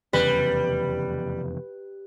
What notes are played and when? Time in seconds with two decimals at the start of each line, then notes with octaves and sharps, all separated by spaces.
0.13 F1 E2 C#3 G3 B4